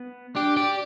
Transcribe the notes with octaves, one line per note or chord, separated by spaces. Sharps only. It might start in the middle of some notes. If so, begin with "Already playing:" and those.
Already playing: B3
D4 G4
G4 D5